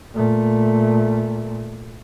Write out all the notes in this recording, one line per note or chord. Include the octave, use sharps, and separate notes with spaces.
A#2 A3